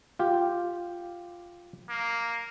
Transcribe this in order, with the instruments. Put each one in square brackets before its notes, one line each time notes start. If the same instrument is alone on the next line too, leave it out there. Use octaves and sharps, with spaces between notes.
[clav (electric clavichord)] F4 G4
[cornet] A#3